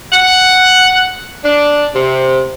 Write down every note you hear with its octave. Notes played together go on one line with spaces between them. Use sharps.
F#5
D4
C3